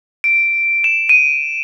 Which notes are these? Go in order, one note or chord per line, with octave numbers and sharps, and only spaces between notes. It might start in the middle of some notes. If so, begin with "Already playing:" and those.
D7
E7
D#7